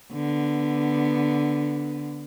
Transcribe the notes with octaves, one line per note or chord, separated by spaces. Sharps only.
D3 B3